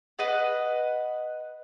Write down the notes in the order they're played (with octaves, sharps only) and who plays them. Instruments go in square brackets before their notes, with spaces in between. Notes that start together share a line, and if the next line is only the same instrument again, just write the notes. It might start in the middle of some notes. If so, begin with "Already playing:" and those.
[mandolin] B4 D#5 F#5